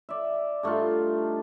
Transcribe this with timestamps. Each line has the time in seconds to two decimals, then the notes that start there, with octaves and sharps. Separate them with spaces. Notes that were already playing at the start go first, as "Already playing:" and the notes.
0.09 D5 E5
0.63 G2 A3 D#4 F4